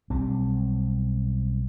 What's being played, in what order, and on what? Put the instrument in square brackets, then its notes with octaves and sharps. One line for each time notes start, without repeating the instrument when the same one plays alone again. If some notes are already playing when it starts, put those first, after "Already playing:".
[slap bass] B1 G3 C4